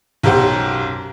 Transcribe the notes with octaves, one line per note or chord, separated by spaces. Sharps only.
B1 F#2 G4 C5 F#5